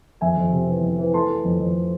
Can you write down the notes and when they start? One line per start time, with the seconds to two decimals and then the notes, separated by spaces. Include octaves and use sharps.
0.21 F2 E5 G#5
0.37 F2
0.53 C3
0.68 E3
0.82 F2
0.98 E3
1.14 A3 A5 C6
1.29 A3
1.44 F2
1.60 F2